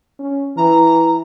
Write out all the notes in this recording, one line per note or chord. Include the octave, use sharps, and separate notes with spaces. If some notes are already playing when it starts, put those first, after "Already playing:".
C#4
E3 A#5